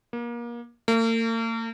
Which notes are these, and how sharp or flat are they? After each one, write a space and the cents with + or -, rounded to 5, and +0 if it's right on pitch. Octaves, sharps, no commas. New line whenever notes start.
A#3 +30
A#3 -45